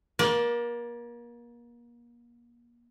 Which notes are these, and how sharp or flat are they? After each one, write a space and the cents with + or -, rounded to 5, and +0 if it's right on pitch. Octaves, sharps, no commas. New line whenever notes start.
A#3 +35 D5 +0